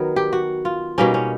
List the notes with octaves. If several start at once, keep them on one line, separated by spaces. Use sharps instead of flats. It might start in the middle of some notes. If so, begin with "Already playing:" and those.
Already playing: D#3 F#3 B3 A#4
G4
F#4
F4
B2 G3 A#3 C#4 D#4
C#4